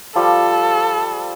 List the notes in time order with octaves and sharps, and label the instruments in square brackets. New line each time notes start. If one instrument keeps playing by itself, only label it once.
[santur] F3 G3 [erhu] A4